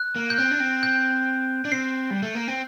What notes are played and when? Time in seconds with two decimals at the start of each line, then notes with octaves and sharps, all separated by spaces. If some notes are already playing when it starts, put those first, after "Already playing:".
Already playing: F#6
0.16 A#3
0.30 G6
0.38 C4 F#6
0.51 D4
0.60 C4
0.83 G6
1.65 D4
1.72 C4 C7
2.11 G3
2.23 A3
2.35 A#3
2.48 C4